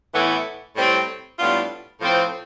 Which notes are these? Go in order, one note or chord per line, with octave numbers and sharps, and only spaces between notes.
A2 E3 B3 E4
A2 G3 C4
A2 G3 B3 D4 F4
A2 F3 C4